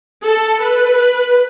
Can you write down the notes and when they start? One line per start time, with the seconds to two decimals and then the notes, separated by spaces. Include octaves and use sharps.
0.25 A4
0.61 B4